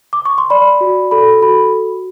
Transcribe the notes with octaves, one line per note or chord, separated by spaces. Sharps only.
D6
C#6
C6
D5 B5
F#4
A4 B5
F#4 B5